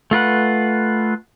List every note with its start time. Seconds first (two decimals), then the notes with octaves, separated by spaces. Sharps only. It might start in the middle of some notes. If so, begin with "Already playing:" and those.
0.11 A3 F4 B4 F#5